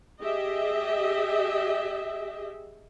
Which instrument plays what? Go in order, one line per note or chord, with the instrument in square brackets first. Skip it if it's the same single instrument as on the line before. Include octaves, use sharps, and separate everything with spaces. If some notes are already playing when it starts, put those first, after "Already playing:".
[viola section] G4 G#4 D#5 E5